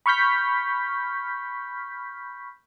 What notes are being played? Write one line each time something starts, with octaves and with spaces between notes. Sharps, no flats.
B5 C#6 F6 G6 B6